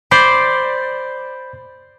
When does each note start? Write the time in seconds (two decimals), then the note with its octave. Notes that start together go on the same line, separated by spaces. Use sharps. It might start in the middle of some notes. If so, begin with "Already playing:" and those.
0.11 C5 D5 B5 G6 C7